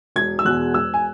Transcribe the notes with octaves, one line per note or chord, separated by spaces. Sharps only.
E1 G#6
E6
E2 B2 G#3 F#6
E1 E6
G#5